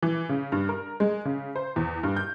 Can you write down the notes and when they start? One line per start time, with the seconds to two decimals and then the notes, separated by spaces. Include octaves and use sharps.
0.02 E3
0.29 C#3
0.52 G2
0.69 A#4
1.00 G#3
1.25 C#3
1.56 C5
1.76 E2
2.03 G2
2.17 G6